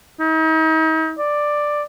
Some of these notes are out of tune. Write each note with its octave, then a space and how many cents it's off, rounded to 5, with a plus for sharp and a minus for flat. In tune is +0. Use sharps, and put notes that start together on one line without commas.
D#4 +40
D5 +5